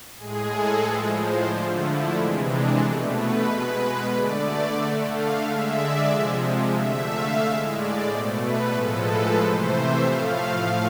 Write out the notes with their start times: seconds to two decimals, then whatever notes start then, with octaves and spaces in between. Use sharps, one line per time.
0.18 A2 G#3 G#4
0.50 A4
0.83 A2 F3 G#3 B4
1.17 C5
1.49 D3 F3 A3 D5
1.82 E4
2.15 C3 E3 G#3 D4
2.47 D4
2.80 B2 A3
3.13 B4
3.46 B2 G#3 B4
4.12 D3 A3 D5
4.78 D3 A3 E5
5.10 F5
5.43 D3 G#3 E5
5.76 D5
6.09 C3 F3 G#3 E5
6.75 D3 A3 E5
7.07 F5
7.40 A2 G#3 E5
7.73 D5
8.06 B2 A3 C5
8.40 B4
8.72 A2 F3 G#3 A4
9.05 B4
9.38 C3 E3 A3 C5
9.70 E5
10.03 A2 F3 A3 F5